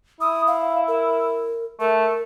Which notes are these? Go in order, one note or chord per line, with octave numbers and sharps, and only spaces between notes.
E4 D#6
F5
A#4
A3 A#4